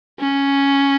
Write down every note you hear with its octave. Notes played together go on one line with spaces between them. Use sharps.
C#4